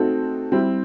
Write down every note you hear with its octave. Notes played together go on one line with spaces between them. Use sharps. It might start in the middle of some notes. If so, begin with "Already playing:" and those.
Already playing: A3 C4 D#4 F#4 A4
G3 C4 E4